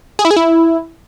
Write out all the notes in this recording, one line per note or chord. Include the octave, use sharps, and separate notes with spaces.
G#4
E4
G#4
E4